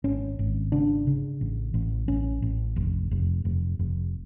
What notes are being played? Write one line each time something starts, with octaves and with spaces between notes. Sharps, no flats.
G#1 C#4
G#1
C#3 D4
C#3
A1
A1
A1 C#4
A1
F1
F1
F1
F1